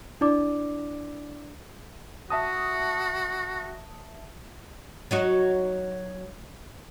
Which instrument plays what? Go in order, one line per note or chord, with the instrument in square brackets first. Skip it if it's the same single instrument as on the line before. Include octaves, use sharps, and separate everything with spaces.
[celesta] D4 E4 D5 D6
[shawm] F#4 [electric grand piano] E5 A5 D#6
[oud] F#3 D#4 F#4